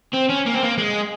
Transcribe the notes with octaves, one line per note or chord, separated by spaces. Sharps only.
C4
C#4
A#3
C4
A#3
G#3